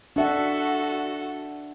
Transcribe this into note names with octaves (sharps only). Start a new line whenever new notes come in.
D4 F#4 A4 E5 F#5